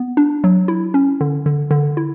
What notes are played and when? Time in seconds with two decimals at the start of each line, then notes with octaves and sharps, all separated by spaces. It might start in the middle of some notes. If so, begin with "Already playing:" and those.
Already playing: B3
0.17 D4
0.44 F#3
0.68 E4
0.94 C#4
1.21 D3
1.46 D3
1.71 D3
1.97 E4